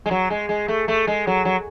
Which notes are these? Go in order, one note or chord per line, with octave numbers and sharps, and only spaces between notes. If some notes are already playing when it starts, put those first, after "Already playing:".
G#3
F#3
G#3
G#3
A3
A3
G#3
F#3
F#3